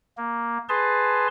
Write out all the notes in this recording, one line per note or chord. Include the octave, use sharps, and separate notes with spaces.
A#3
G#4 B4 A5 C6